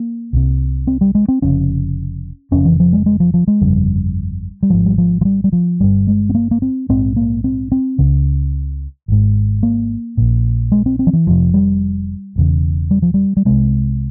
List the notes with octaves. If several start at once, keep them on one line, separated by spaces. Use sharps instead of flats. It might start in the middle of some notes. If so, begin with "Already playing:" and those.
Already playing: A#3
C2 C3
C4
G3
G#3
C4
F1 F2 C#3 C#4
F1 F2 C#3 C#4
E3
F3
G#3
G#3
F3
F3
G#3
G1 F2 C#3 G3
G3
G#1 G#2 F3
G3
F3
F3
G3
G3
F3
G1 G2 G3
G#3
C4
A#3
A#3
C4
A#1 G#2 C4
A#3
C4
C4
C#2 C#3
G#1 G#2
A#3
A#1 A#2
G#3
C4
C4
F3
E3
F1 F2 C3 F3
G3
E1 E2 C#3
G3
F3
G3
G3
C2 C3 G#3